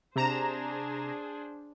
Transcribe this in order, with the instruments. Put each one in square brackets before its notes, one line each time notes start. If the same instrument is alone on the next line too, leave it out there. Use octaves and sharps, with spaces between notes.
[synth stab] C3 A#5 E7 [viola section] D4 G#4 C5